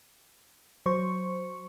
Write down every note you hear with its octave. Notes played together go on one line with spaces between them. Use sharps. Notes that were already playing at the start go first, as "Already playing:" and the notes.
F#3 C5 C#6